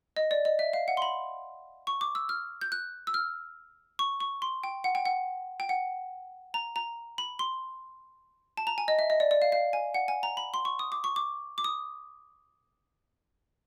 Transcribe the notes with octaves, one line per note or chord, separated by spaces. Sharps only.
D#5
D5
D#5
E5
F5
F#5
C6
B5
C#6
D6
E6
F6
G6
F#6
E6
F6
C#6
C#6
C6
G5
F#5
G5
F#5
G5
F#5
A#5
A#5
B5
C6
A5
A#5
G#5
D#5
E5
D#5
D5
D5
F5
F5
G#5
F#5
G#5
A#5
B5
C6
C#6
D#6
D6
C#6
D6
D6
D#6